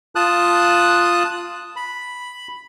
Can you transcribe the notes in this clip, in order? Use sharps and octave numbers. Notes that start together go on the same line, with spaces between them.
F4 A5 D#6 F#6
B5